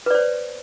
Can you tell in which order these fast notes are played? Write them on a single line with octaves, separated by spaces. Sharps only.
B4 D5 C5